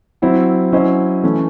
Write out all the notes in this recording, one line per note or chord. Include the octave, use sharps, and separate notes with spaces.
F#3 C4 E4
F#3 C#4 E4 C5 D#5
E3 A3 C#4